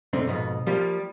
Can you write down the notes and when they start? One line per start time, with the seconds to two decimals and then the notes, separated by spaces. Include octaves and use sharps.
0.13 B1 F#2 D3 C4
0.27 F2 G#2 B2
0.67 F3 G3 A#3 G4